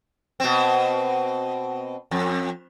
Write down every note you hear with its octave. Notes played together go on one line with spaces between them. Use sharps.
B2 C4
F2